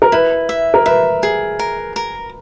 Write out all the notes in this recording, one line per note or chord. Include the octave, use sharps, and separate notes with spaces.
A#4
E4 B4
E5
A#4
B4 E5
G#4
A#4
A#4